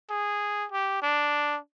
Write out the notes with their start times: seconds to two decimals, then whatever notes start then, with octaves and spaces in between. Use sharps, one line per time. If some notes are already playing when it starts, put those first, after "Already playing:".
0.10 G#4
0.72 G4
1.03 D4